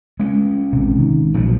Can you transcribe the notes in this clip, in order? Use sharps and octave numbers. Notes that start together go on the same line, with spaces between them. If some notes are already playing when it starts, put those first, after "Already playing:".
G#3 C#4
A1 C3
D#3
A#1 F3 F#3